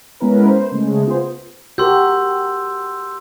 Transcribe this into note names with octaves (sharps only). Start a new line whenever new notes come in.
G#3 B3 C#4 E4 A#4 B4
C5
C#3 G#3 A3
B3 F4 G#4 C5
F#4 G4 A#4 C6 E6 G6